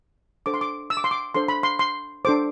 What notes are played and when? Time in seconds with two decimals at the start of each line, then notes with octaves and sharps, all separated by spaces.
0.46 D4 A4 C5 D6
0.54 C6
0.61 D6
0.90 E6
0.97 D6
1.04 C6
1.11 D6
1.35 D4 A4 C5 C6
1.48 B5
1.63 C6
1.79 C6
2.25 D4 A4 C5 D6